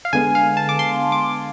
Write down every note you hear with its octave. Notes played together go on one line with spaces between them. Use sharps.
F5
D3 G#3 B3 G#5
F5
A5
D6
C6
D6